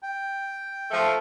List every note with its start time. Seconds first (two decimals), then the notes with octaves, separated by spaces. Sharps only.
0.03 G5
0.91 F3 A3